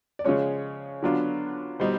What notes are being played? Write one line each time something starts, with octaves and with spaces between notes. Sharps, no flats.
D5
C#3 F3 G#3 C#4 C#5
D3 F#3 B3 D4 F4
B2 G3 B3 D#4 C5